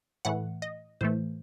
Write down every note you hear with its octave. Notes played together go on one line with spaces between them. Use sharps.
A2 E3 A3 F#5
D#5
A2 E3 A3 C5